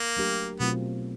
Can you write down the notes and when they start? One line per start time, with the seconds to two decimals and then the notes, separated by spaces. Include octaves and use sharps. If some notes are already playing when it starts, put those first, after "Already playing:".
Already playing: A#3
0.17 F#3 A3 D4 G4 A#4
0.60 B2 F#3 A3 B3 C4 F4